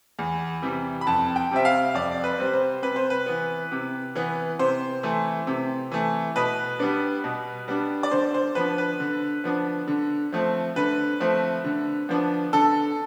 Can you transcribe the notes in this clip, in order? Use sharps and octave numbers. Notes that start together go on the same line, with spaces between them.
E2
C3 E3 G3
B5
F2 A5
G5
C3 G3 C4 E5
F5
F2 D5
B4
C3 G3 C4
C5
C3 B4
C5
B4
E3 B3
C3
E3 B3
C3 C5
E3 A3
C3
E3 A3
B2 B4
G3 B3 D4
B2
G3 B3 D4
D5
D3 C5
C5
F3 B3 D4 B4
B4
D3
F3 B3 D4
D3
F3 A3 C4
D3 B4
F3 A3 C4
D3
F3 B3 D4
D3 A4